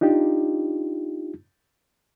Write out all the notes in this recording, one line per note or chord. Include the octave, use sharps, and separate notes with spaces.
D4 D#4 F4 G4